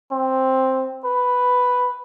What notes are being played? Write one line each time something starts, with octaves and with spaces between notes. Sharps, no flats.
C4
B4